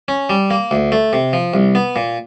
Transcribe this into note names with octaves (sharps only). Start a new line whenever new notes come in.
C#4
G3
A#3
D2
A3
C3
F3
C2
B3
A#2